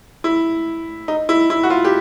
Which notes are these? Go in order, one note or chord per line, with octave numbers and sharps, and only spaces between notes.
E4
D#4
E4
E4
F#4
F4
G4